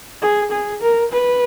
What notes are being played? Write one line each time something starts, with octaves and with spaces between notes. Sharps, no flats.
G#4
G#4
A#4
B4